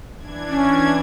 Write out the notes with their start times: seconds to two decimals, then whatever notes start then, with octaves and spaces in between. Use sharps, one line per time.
0.18 E3 D4 G#6
0.48 C#4